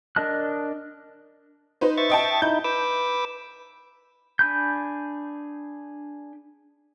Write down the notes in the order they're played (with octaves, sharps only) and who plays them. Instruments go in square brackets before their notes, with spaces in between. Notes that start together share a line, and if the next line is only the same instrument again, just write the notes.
[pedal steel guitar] D4 A#4 D#5 A5 F#6
[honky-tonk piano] D#4 B4 C5
[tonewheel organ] E5 C#6 A6
[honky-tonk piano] D#5 G5 A5
[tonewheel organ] D#4 E4 [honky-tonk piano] G6
[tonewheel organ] B4 D6 E6
[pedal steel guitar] D4 G#4 B5 G6